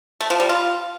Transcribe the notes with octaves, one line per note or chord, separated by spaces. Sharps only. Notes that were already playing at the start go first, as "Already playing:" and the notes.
A3
F3
G3
F4